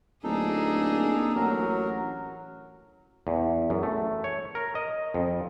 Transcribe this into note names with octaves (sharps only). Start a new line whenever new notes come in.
D1 A#3 D4 D#4 G#4 A4
A1 F#3 A#4
E2
F#2
A3
C#5
A#4
D#5
F2